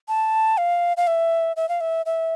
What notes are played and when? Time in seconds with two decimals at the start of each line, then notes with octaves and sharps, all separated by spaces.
0.08 A5
0.58 F5
0.97 F5
1.07 E5
1.56 E5
1.69 F5
1.81 E5
2.06 E5